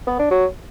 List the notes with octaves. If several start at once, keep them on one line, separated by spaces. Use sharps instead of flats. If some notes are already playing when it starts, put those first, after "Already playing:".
B3
D4
F#3